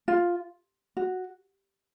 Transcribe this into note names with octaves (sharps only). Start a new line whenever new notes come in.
F4
F#4